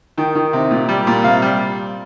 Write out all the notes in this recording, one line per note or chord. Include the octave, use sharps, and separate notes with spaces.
D#3 G5
D#3
C3
A#2
G3
A#2
C3 F5
G3